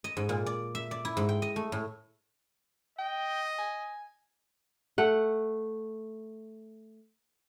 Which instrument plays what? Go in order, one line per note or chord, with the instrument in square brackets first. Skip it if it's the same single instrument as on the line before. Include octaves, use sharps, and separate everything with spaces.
[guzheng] D#5
G#2
A#2
D5
E5
D5
E4
G#2
G5
D#5
A3
A2
[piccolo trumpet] D#5 [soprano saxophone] G5
[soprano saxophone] G#5
[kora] A3 F#5